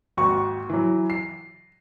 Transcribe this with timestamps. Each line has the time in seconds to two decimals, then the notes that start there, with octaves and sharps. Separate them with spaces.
0.17 G#1 D#2 F#4 C#6
0.70 E3 F#3
1.10 C7